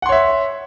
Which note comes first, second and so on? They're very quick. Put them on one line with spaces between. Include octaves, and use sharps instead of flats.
F#5 C6 C#5 E5